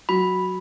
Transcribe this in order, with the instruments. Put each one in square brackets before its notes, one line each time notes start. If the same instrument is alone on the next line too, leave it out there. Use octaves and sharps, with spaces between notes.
[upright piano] F#3 [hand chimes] B5